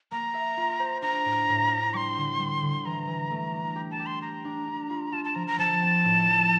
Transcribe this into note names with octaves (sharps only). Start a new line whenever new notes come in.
A#3 A#5
E5
F4
C5
D4 A#5
A2
A2
D4
G3 C6 D6
D3
G3
D3
E3 A#5
E3
A3
D4
G4
A5
G4
C6
G4 A#5
D4
D4
F4
F4 A5
A5
F3 A#5
A#5
F3 A5
C4
A2
F3